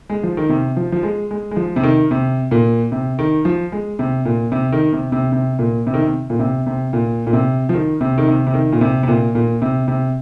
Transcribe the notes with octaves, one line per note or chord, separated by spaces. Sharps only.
G#3
F3
D#3
C3
F3
F3
G#3
G#3
G#3
F3
C3
D#3
C3
A#2
C3
D#3
F3
G#3
C3
A#2
C3
D#3
C3
C3
C3
A#2
C3
D#3
C3
A#2
C3
C3
A#2
A#2
C3
F3
D#3
C3
D#3
C3
C3
D#3
A#2
C3
C3
A#2
A#2
C3
C3